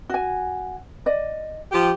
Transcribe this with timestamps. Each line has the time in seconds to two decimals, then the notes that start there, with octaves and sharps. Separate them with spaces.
0.10 F#4 G#5
1.06 D5 D#5
1.72 F3 G4